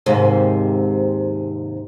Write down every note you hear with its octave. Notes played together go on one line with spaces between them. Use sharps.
D#2 G#2 C3